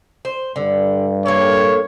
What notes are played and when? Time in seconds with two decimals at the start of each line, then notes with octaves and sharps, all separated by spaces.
0.25 C5
0.56 G2 D3
1.26 A#3 A4 C#5